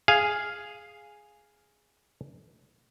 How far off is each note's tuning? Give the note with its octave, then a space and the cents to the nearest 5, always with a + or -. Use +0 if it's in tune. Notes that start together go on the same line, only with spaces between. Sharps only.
G#4 +0 F5 +0